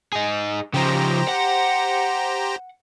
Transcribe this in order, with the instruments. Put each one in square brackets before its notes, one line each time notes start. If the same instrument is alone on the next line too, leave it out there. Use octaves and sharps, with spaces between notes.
[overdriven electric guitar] D#4 G#4
[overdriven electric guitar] C#3 F3 [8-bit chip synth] G4 C5 A#5
[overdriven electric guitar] F#5